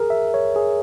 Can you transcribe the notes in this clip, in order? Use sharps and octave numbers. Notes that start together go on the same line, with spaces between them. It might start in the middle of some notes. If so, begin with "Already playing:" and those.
Already playing: G#4 A#4
E5
C#5
G#4